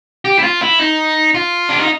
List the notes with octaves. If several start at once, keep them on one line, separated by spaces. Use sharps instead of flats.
G4
E4
F4
E4
D#4
F4
D4
D#4